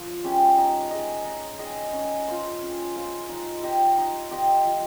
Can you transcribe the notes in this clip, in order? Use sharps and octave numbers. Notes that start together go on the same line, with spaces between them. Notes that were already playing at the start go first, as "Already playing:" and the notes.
Already playing: F3
G#3 C#4 G4
D#4
G#4 D#5
D#4
G#4 D#5
C#4
F4 C5
C#4
F4 C5
D#4
G4 C5 D#5
D#4
G4 C5 D#5
F3